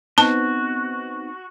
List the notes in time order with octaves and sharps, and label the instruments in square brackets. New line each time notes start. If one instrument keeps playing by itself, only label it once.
[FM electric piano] B3 C4 D#4 [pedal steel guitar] F#4 [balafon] A5